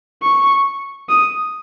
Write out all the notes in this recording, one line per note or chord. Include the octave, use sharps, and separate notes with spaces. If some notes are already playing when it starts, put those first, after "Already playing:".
C#6
D#6